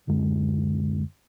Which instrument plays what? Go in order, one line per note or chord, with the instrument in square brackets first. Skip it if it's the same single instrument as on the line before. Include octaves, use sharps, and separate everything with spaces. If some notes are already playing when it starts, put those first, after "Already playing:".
[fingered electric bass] D1 F#2 D3 G#3